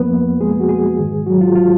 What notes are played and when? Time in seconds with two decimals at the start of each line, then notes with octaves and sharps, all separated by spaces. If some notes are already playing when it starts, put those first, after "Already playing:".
Already playing: F2 F3 A#3 B3 B4
0.41 G#3 G#4
0.60 F#4
0.69 G#3 G#4
0.98 G#2 D#3 G#3
1.26 F#3 F#4
1.41 F4
1.56 F4